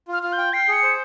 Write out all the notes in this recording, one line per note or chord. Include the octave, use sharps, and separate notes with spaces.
F4 F6
F4 F6
G6
G5
G5 C7
G#4 C#7
C5